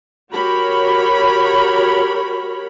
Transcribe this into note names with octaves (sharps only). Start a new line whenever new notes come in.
F#4 G4 A#4 C#5 B5